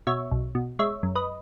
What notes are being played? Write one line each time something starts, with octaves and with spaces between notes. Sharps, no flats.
B2 C#5 E5
B1
B2
G#3 C#5 E5
F#2
B4 D#5